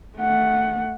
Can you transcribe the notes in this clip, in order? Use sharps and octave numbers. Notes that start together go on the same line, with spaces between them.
A3 F#5